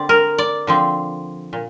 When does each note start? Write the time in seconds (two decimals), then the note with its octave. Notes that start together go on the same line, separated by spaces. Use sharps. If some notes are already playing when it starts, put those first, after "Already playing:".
Already playing: D3 G3 C4 D5
0.09 A#4
0.38 D5
0.67 D3 F3 C4
1.53 A#2